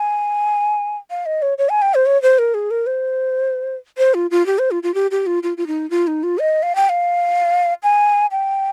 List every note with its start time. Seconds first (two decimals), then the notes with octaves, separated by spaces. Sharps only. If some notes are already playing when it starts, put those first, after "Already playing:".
Already playing: G#5
1.10 F5
1.26 D#5
1.42 C#5
1.58 C#5
1.69 G#5
1.82 G5
1.94 C5
2.06 C#5
2.22 C5
2.39 A#4
2.54 G#4
2.71 A#4
2.87 C5
3.98 C5
4.14 F4
4.31 F4
4.46 G4
4.59 C5
4.71 F4
4.83 F4
4.94 G4
5.11 G4
5.27 F4
5.43 F4
5.57 F4
5.67 D#4
5.90 F4
6.07 D#4
6.23 F4
6.39 D#5
6.63 F5
6.76 G5
6.89 F5
7.83 G#5
8.31 G5